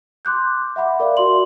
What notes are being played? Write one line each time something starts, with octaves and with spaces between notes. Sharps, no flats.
C6 D6 F#6 G6
E5 F#5 B5 D6
A#4 D5 E5 F5
F#4 A#4 D5 C6 F#7